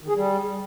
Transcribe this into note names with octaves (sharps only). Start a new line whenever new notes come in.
D#3
G#4
G3